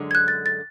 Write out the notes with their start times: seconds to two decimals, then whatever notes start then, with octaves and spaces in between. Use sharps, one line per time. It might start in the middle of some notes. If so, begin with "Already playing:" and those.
Already playing: F#2 D3 G#3
0.11 G#6
0.15 F#6
0.28 A6
0.46 A6